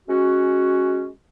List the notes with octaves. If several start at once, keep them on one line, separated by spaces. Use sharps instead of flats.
G#3 C#4 F#4